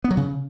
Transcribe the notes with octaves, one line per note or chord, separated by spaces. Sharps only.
B3
F#3
C#3